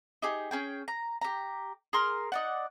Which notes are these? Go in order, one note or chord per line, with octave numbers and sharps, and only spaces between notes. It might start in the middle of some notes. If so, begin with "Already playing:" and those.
D#4 G4 G#4
C#4 G#4 G5
A#5
G4 A#5
G#4 A#4 C6 F6
D#4 D5 F#5